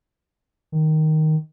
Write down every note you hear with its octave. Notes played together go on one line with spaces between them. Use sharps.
D#3